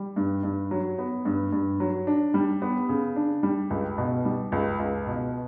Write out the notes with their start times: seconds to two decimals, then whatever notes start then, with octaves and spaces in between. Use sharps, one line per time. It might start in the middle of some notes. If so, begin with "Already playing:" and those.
Already playing: G3
0.16 G2
0.43 G2
0.71 F#3
0.99 B3
1.25 G2
1.52 G2
1.80 F#3
2.07 D4
2.34 G3
2.62 B3
2.89 C#3
3.16 D4
3.43 G3
3.70 C#2
3.98 B2
4.25 G3
4.52 C#2
4.79 C#2
5.07 B2